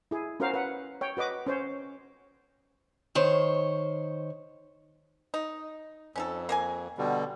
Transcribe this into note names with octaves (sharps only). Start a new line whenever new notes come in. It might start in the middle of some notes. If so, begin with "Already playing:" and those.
E4 G#4
C#4 F#4 A#4 C5 F5
B4 F#5
C#5 G5
F#4 B4 D#5 D6
C#4 C5 C#5
D#3 C5 C#5
D#4
F2 C#4 D#4 A4
A#3 A#4 G#5
B2 D3 G3